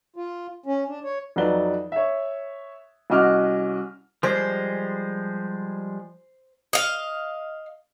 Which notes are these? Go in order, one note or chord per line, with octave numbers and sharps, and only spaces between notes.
F4
C#4
D4
C#5
F2 F#3 D#4 B4 D5 G7
C#5 E5
C2 C#4 F#4 D#5 D6 F6
F3 G3 G#3 C5
D#5 F5